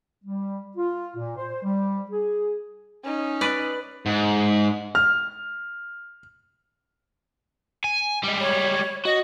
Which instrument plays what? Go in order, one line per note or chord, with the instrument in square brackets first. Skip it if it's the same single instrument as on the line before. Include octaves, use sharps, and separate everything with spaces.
[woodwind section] G3
F4
A#2
C5
G3
G#4
[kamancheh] C#4 D#4
[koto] B4 D5
[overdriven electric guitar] G#2
[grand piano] F6
[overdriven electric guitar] G#5
G3 G#3
[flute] C#5
[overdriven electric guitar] F#4 [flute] D#5